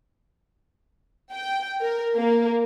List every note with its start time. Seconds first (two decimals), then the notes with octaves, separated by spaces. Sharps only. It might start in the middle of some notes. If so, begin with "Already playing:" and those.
1.31 G5
1.81 A#4
2.16 A#3